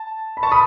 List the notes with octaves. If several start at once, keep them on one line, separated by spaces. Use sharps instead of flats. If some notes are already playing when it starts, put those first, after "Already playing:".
Already playing: A5
B5
A5 C#6
B5 D#6